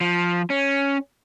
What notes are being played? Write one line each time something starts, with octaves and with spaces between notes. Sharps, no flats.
F3
C#4